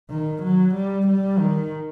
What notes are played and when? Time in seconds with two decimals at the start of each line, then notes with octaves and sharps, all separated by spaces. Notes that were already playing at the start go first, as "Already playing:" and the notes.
0.10 D#3
0.43 F#3
0.75 G3
1.07 G3
1.39 D#3